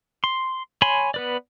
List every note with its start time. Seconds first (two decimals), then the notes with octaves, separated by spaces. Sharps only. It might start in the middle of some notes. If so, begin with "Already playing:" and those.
0.24 C6
0.82 C#5 G#5 B5 C6
1.14 B3 B4 D5